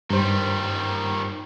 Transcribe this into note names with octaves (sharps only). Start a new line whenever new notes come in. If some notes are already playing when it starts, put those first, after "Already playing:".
G2 D#3 G3 C5